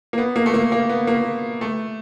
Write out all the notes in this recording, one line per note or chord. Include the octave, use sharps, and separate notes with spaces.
A#3
B3
A#3
A3
A#3
A#3
B3
A#3
A3